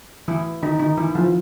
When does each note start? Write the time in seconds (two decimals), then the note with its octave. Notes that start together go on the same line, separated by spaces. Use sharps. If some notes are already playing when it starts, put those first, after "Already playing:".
0.28 E3 E4
0.63 D#3 D#4
0.79 D#3 D#4
0.97 E3 E4
1.15 F3 F4